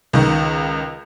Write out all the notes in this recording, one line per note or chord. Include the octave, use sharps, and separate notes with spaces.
C#2 D#3